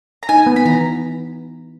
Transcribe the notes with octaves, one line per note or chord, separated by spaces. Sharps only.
A#5
D#4 G#5
B3
B5
E3 A#5